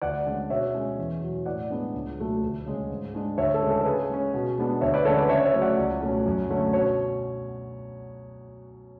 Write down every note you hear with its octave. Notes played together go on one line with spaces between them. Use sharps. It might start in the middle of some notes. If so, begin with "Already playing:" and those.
D2 D5 F#5
D3 G#3 C#4
B2 C#5 E5
G#3 C#4
E2
B2 F#3
A2 D5 F#5
G#3 B3 D4
C#2
B2 F#3 A3
D2
C#3 G#3
G#2
G#3 D4
D2 C#5 E5
A4
C#3 G#3 C#4
A4
A4
C#3 G#4 B4
G#3 C#4
B2
G#3 B3 D4
D2 C#5 E5
B4 D5
D3 G#3 C#4 A4 C#5
B4 D5
C#3 C#5 E5
C#5 E5
F#3 A3 C#4
D5 F#5
C#2
B2 A3 C#4
F#2
D3 A3 C#4
B2 C#5